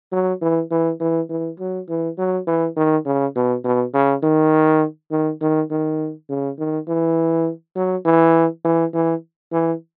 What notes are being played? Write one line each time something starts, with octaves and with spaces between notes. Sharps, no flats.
F#3
E3
E3
E3
E3
F#3
E3
F#3
E3
D#3
C#3
B2
B2
C#3
D#3
D#3
D#3
D#3
C#3
D#3
E3
F#3
E3
E3
E3
E3